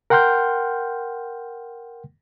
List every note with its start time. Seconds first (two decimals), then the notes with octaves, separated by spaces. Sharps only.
0.10 A#4 F#5 G5 C6 F6 G6